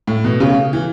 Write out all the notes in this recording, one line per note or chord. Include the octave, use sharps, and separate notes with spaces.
A2
B2
C#3
E3